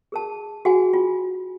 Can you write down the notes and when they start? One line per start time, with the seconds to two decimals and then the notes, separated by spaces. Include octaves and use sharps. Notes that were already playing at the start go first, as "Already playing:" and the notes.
0.12 G#4 A#4 A5
0.65 F#4 G#4 F#5 G#5
0.93 F4